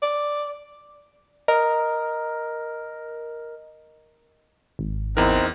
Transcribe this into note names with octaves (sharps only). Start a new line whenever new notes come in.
D5
A#4 D#5
G#1
E2 C4 D#4 E4 A#4 F#6